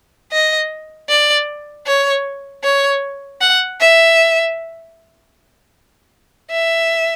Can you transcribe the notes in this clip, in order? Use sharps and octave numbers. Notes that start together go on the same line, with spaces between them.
D#5
D5
C#5
C#5
F#5
E5
E5